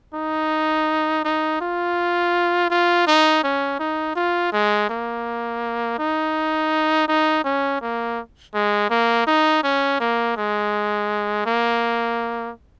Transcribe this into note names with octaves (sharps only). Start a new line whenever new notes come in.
D#4
D#4
F4
F4
D#4
C#4
D#4
F4
G#3
A#3
D#4
D#4
C#4
A#3
G#3
A#3
D#4
C#4
A#3
G#3
A#3